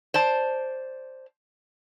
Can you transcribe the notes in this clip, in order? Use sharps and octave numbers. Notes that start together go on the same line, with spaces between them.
C5 D5 A5